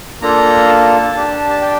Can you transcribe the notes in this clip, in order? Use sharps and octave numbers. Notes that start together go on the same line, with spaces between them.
A#3 D4 F4 A4 A#5
A5
D4 G4
A5
G5